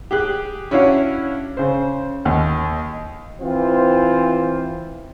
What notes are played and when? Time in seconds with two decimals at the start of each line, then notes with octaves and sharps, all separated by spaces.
0.11 G4 G#4 F#6
0.71 C#4 D4 E4 F#4 C#5 F5
1.57 C#3 C5
2.25 D#2
3.41 E3 C4 F4 C5